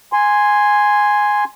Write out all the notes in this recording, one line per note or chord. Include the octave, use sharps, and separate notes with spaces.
G#5 C6